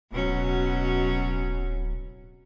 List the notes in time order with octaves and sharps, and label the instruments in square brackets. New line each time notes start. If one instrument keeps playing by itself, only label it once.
[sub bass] D1 [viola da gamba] B2 F#3 C#4